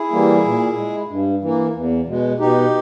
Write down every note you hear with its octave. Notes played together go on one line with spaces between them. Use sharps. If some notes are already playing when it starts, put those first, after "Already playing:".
Already playing: E4 G#4
E3 G3 A#3
A#2
G#3
G2
E3 A#3
E2
B2 G#3
B2 D#4 G4